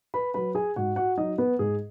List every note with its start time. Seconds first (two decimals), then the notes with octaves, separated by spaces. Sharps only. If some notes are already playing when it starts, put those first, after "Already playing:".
0.14 B4 B5
0.34 F#3 B4 B5
0.55 G#4 G#5
0.76 G#2 F#4 F#5
0.96 F#4 F#5
1.17 F#3 D#4 D#5
1.38 B3 B4
1.59 G#2 G#4